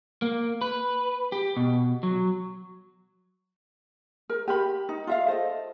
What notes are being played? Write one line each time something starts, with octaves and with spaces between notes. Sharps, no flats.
A#3
B4
G4
B2
F#3
A#4
G4 A#4 B5
D#4
F4 E5 F5
A4 C5 D#5